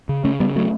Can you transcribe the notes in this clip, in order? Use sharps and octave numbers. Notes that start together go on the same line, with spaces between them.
C#3
C#3 A3 C#4
C#3 G3 B3
F#3 A3